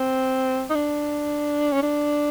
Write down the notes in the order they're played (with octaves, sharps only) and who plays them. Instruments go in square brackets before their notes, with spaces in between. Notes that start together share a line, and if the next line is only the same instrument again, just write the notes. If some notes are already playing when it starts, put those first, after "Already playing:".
Already playing: [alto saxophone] C4
D#4
D4
C#4
D4